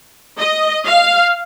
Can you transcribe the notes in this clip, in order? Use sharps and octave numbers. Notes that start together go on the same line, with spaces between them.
D#5
F5